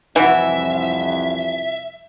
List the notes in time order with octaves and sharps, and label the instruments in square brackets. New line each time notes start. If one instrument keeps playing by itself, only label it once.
[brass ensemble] C2 F2 [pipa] E3 [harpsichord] F#4 B4 [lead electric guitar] E5